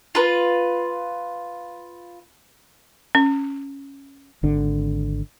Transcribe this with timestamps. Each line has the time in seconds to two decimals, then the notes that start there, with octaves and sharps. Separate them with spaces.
0.15 F4 B4
3.15 C#4
4.43 G#1 D3